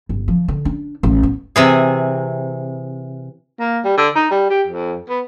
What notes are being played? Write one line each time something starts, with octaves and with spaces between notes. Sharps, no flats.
G1
F3
D3
D4
A1
B3
C3 E3 G#4
A#3
G3
D3
D#4
G3
G4
F2
B3